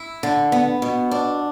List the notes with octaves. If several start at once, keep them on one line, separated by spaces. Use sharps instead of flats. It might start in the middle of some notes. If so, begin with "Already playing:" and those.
Already playing: E4
D3
B3
B2
D4